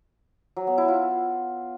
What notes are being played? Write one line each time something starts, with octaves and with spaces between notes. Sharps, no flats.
F#3
B3
E4
F4